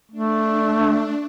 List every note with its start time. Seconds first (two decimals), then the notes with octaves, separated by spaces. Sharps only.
0.11 A3 D4